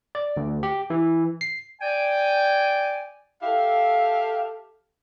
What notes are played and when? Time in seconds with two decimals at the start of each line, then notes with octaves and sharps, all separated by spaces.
0.15 D5
0.37 D2
0.63 G4
0.90 E3
1.41 C7
1.81 D5 G5 G#5
3.42 G4 A4 E5 F5